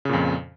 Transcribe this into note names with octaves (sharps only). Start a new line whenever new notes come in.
F2 A#2 C#3